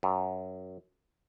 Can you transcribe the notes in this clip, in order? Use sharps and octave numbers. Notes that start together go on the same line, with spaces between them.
F#2